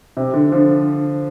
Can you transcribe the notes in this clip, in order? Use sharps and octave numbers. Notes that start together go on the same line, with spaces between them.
C3
D3
D3 F3